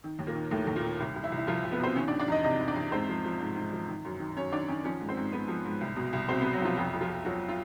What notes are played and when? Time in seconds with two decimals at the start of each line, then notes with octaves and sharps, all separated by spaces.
0.04 D#3
0.19 D#2
0.27 A#2 A#3
0.35 D#3
0.51 D#2 A2 A3
0.65 D#2 A3
0.76 A#2 A#3
0.84 D#3
1.00 C2
1.16 C2
1.23 E3 E4
1.32 C2
1.37 E4
1.47 C2 F3 F4
1.64 C2
1.72 B3 B4
1.80 B2 C4 C5
1.95 D#3 C#4 C#5
2.07 D4 D5
2.11 D#3
2.19 D4 D5
2.28 E2 D#4 D#5
2.43 C3 D#4 D#5
2.60 E2
2.68 D4 D5
2.76 E2
2.92 G#2 C4 C5
3.09 F3
3.25 F3
3.40 G#2
3.56 G#2
3.73 F3
3.88 D#3
4.05 F#2
4.20 D#3
4.36 F#2 C#4 C#5
4.52 D#3 D4 D5
4.68 D#3 C#4 C#5
4.84 F3 C#4 C#5
5.00 G#2
5.09 C4 C5
5.17 G#2
5.32 G#2 B3 B4
5.48 F3
5.65 G#2
5.81 C2
5.96 B2
6.13 C2
6.29 B2 C4 C5
6.41 B3 B4
6.44 B2
6.53 F#3 F#4
6.61 C2 F3 F4
6.77 F2 F#3 F#4
6.93 F2
7.01 F3 F4
7.09 F2
7.25 F3 F#3 F#4
7.49 F4